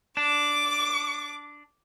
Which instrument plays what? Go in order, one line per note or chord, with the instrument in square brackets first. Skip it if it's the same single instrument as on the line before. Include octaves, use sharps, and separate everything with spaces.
[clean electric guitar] D4 [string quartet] D6